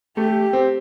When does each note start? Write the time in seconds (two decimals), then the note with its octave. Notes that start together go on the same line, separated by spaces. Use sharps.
0.17 A3 G4
0.53 C4